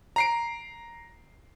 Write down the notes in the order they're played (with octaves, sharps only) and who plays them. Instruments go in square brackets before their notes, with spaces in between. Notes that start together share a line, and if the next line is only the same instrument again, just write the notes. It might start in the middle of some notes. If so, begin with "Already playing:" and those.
[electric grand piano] A#5 C7 D7